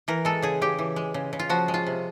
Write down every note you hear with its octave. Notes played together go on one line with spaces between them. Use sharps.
E3 A#4
G#3 A4
C#3 G#4
C#3 G4
E3
G#3
C#3
C#3
F4
F3 F#4
G#3
F4
C3